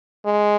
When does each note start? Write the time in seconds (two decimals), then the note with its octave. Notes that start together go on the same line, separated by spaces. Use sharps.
0.26 G#3